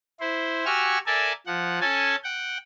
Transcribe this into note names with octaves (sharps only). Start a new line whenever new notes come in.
E4 C5
F#4 G4 G#5 C#6 E6 F6
A4 A#4 D5 E5 G#5 A5
F3 F#5
C#4 A4 C#5 G#5 A5
F#5 G5